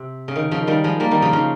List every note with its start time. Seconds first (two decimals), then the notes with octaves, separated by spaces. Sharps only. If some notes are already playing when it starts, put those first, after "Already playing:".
Already playing: C3
0.28 C#3
0.36 D#3
0.51 C#3 F3
0.67 D#3 G3
0.84 F3 G#3
1.00 G3 A#3
1.11 D#3 G3
1.22 C#3 F3
1.33 C#3 F3